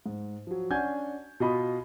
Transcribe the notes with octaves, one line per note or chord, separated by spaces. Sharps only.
G#2
F3 F#3
C#4 D4 F#5 G#5 G6 G#6
B2 F4 D#5 B5